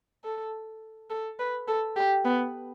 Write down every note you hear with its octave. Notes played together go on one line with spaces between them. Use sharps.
A4
A4
B4
A4
G4
B3